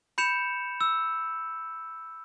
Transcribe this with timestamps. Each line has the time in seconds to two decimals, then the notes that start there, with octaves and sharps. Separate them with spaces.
0.18 B5 G6 C#7 E7 F7
0.81 E6